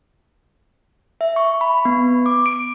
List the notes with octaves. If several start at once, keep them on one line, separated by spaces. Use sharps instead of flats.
E5
C#6
B5
B3
D6
D7